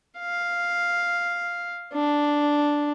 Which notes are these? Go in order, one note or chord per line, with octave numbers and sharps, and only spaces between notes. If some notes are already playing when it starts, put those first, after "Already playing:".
F5
D4